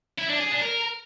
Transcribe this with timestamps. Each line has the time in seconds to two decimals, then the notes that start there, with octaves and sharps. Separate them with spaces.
0.19 E4
0.30 D4
0.41 G#4
0.51 D4
0.62 A#4